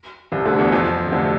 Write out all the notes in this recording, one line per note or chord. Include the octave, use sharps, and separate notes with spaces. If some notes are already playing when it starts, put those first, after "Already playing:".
C2 C3
D2 D3
E2 E3
F2 F3
C3
D2 D3